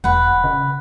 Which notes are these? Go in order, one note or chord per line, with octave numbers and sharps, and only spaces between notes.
E1 B4 F#5
C#3